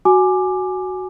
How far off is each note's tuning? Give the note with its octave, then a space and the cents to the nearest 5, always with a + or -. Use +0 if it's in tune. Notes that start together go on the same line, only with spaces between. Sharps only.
F#4 +5 G#5 +10 D6 +15